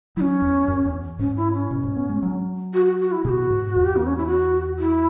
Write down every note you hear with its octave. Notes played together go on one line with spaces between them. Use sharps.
F#3 C#4 E4
E2
F#2
E2
G#2 C#4
E4
C#4
B2
G#2
B3
G#3
F#3
F#4
F#4
F#4
E4
B2 F#4 G#4
G#2
E2
B3
C#4
E4
F#4
E4